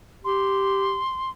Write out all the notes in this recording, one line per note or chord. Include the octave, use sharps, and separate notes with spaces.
G4 C6